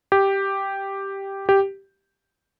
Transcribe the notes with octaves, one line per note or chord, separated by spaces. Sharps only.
G4
G4